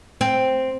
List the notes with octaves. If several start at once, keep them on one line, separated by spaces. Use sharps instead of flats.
C4